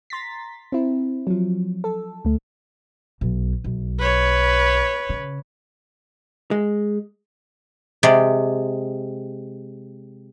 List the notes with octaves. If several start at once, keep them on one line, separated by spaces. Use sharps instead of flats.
A#5 C6 A6 B6
C4 E4
F3 F#3
A4
D2 A3
B1
B1
B4 C#5
C#3
G#3
C3 G#3 D5